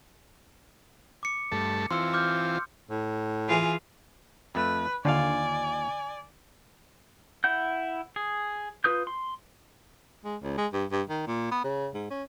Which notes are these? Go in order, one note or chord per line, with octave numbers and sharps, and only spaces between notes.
D6 C#7
G2 A3 A5
E3 C4 F4 C6 E6 C#7
D6 F6 G6
A2
E3 F4 G#4
F2 A3 B4
D#2 D3 F4 D5 F5 G#5
E4 F#5 G6
G#4
F4 B4 D#6 G6
C6
G#3
C#2
G#3
G2
G2
D#3
A#2
B3
C#3
G#2
C#4